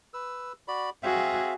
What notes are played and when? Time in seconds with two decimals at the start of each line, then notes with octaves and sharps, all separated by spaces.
0.14 B4 E6
0.68 F#4 D5 B5
1.03 C4 F#4 G#4 E5 F5